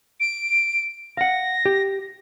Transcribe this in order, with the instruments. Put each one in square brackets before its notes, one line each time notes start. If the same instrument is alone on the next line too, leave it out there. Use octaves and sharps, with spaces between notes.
[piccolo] D7
[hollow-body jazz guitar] F5 F#5 [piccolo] A#6
[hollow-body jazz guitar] G4